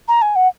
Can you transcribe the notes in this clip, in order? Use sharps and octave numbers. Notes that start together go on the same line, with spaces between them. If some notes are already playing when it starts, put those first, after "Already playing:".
A#5
G#5
F#5